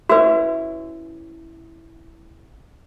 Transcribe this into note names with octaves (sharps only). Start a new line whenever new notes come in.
C#4 D4 E4 F#4 B4